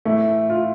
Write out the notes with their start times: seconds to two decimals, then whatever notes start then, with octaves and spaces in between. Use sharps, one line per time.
0.05 A2 E3 A3 E4
0.50 F4